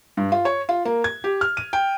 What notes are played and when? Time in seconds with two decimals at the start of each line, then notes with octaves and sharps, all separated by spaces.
0.17 G2
0.32 F4
0.45 C#5
0.69 F4
0.85 A#3
1.04 G#6
1.24 G4
1.41 F6
1.57 D#7
1.73 G5